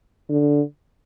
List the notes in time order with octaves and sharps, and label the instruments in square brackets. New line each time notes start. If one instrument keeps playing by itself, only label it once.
[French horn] D3